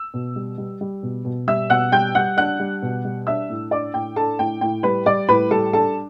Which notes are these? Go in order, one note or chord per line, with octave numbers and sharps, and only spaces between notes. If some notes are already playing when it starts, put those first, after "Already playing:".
Already playing: E6
B2
G3
G3
G3
B2
B2
G3 E5 E6
B2 F#5 F#6
G3 G5 G6
G3 F#5 F#6
D4 F#5 F#6
G3
B2
G3
D4 E5 E6
A2
D4 D5 D6
A2 G5
D4 A4 A5
A2 G5
A2 G5
G3 B4 B5
G3 D5 D6
A2 B4 B5
G3 A4 A5
D4 A4 A5